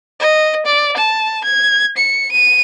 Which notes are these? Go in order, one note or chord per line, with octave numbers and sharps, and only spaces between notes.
D#5
D5
A5
G#6
C#7
D#7